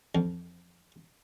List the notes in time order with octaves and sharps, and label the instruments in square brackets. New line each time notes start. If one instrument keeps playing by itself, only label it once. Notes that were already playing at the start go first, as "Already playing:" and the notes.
[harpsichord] F2